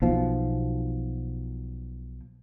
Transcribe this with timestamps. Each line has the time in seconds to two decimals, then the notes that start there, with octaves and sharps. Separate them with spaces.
0.02 B1 B2 F3